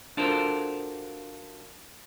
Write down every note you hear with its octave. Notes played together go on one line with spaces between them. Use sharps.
D4 F4 F#4 A4 A#4 C5